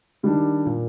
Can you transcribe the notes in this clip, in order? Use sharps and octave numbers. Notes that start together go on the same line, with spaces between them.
D#3 G3 D4
A#2